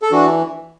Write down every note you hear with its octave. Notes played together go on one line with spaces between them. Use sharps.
A4
E3 D4 F#4